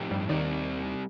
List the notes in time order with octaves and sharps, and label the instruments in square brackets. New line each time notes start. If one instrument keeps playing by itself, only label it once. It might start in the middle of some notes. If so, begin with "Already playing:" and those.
Already playing: [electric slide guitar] A2 F3 C4 D#4 G4
[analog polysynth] G2 G3
[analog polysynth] D#2 D#3 [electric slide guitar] G3 C4 G4 D5